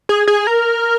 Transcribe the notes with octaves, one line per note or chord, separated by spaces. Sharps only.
G#4
G#4
A#4